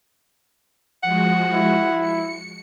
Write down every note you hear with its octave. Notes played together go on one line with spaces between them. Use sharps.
F3 G#3 F#4 F#5
E4
C#7